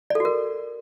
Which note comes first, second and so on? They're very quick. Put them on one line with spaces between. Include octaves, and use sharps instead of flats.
D5 A4 F#4 A#4